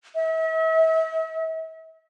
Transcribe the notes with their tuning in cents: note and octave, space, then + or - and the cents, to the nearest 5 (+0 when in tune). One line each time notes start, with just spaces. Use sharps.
E5 -40